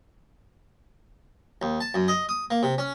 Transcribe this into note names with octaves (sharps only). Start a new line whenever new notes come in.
D#2
A5
F#2
D#5
D#6
A#3
C3
C#4